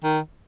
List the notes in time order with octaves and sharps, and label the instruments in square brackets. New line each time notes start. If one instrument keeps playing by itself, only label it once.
[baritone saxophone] D#3